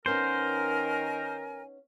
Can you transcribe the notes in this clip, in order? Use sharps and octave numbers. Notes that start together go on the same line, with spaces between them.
D#3 B3 C#4 D#4 A#4 C5 G#5